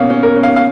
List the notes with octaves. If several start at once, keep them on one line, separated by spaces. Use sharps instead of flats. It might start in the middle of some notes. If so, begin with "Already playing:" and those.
Already playing: B2 A#3 C#4 F5
C#4
A#4
C#4
F5
F5